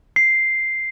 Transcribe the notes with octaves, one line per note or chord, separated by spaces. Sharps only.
C7